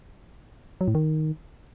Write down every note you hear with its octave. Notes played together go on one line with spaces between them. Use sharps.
F#3
A2
D#3